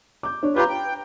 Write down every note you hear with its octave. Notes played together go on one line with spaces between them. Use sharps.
D6 G6
D4 C#5
F4 G4 B4 A#5 G6
G5